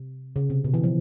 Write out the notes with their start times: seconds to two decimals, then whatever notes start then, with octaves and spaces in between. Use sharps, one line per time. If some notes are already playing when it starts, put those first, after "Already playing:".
Already playing: C3
0.36 C#3
0.50 C3
0.64 B2
0.74 E3
0.84 F3